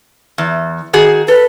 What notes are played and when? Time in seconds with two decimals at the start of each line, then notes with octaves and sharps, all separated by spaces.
0.38 E2
0.93 D#3 F#4 G#4
1.28 A4 B4